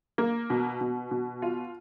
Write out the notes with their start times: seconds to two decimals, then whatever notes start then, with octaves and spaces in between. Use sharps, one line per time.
0.18 A#3
0.50 B2
0.81 B2
1.11 B2
1.42 F4